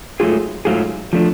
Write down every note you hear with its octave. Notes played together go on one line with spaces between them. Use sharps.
G#2 F#3 A3 F4 G#4
G#2 F#3 A3 F4 G#4
F3 A3 D4